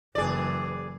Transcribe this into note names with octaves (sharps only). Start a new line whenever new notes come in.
F#1 E3 G#4 D5